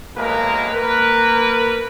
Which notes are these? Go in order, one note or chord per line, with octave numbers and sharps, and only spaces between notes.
B1 A2 G#3 A#3 A#4 B4
A#3 A#4 B4